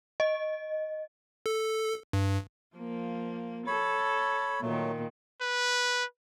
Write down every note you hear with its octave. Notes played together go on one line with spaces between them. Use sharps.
D#5
A4
G2
F3 A#3
A4 C#5 B5
A#2 D#3 F#3 A3
B4